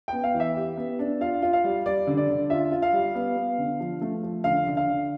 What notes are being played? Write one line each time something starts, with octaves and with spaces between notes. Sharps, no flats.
B3 G5
F5
E3
E5
G4
B3
D4
F4 F5
F4
F5
G3
G3 D5
D3
D5
D3
F4 E5
F4
F5
G3
B3
B3
D3
F3
A3
F3
D3 F5
D3
F5
D3